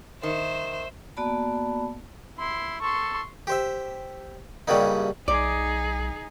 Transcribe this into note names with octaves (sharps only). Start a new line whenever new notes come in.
D#3 C5 E5
A#3 B3 F#4 D5 A5 B5
E4 C6
A4 C6 C#6
G4 C5 E5
G2 C#3 F#3 G3 A#3 D#4
B1 D#4 G#4 D5